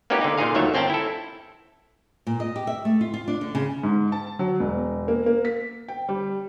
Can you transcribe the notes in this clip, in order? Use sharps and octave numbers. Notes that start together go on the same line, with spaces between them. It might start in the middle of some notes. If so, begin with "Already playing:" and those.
A#3 B3 C#4 D#4 G4
D3 D#4
A#2 D3 D#4 G#4 F5
D#2 D#3 F#3 A3 C#5 E5
G1 C4 C#4 G5 A5 A#5
E4 A4
A#2
D#5
G4
E5
A3
F4
F4
D4
D3
C#3
G#2
A5
F#3
E1
A#3
A#3
B6
G5
G3